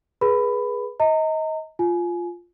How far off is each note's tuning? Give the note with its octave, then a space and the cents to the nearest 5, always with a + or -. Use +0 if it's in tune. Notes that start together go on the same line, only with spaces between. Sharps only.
G#4 +0 B4 -20 B5 +15
D#5 +25 A#5 -35
F4 +0 G#5 +25